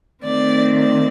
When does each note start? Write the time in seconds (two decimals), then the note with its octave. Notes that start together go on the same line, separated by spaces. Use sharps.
0.23 D#3 A3 C4 D5
0.77 D5